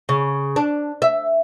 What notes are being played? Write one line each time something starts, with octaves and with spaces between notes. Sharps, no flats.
C#3
D4
E5